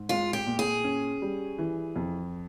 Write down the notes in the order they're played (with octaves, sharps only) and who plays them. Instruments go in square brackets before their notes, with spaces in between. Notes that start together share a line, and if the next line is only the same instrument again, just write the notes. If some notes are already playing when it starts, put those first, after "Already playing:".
Already playing: [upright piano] G#2
[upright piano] G#3 [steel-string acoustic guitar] F4
[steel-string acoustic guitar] G4
[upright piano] A#2
[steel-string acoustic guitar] G#4
[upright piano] C#4
G3
E3
F2